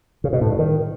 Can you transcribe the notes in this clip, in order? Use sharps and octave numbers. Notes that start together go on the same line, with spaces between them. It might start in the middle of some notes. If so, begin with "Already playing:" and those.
C#3
B2
A2
G2
D#3